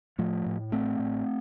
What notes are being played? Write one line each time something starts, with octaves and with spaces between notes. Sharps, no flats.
A2 F3 A3
A2
A1 A3 C4
A2